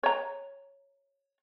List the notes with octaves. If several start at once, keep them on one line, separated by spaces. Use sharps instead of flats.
C#5 A#5